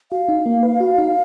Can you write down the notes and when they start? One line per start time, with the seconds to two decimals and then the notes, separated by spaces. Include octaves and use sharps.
0.11 F#4 F5
0.29 D#4
0.46 A#3
0.63 B4
0.80 F#4
0.98 D#4